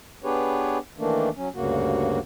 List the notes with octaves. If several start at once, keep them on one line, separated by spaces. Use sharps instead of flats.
B3 D4 G4 G#4 B4 C#5
D#3 E3 A3 A#3 D4
F#3 C#4
D2 G2 C#3 A#3 F#4